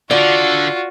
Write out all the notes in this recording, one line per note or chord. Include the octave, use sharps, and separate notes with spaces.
D3 F4 F#4 D5